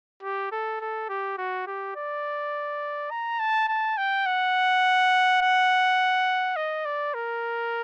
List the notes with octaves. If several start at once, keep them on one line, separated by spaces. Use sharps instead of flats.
G4
A4
A4
G4
F#4
G4
D5
A#5
A5
A5
G5
F#5
F#5
D#5
D5
A#4